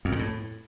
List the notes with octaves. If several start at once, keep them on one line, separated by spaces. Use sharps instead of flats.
F2
A#2
A2